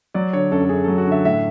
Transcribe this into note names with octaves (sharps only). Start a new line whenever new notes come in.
F#3 D5
D3 C#5
F#2 A4
A4
F#2 G#4
F#3 A4
F#4
D3 E5
A2 E5